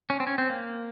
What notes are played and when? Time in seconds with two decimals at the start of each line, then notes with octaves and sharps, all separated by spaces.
0.10 C#4
0.20 C4
0.27 C#4
0.38 C4
0.50 A#3